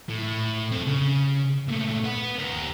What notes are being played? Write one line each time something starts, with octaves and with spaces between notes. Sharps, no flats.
A2
C4 A4
C#3
A#2 A3
B4 F#5
G4 A#4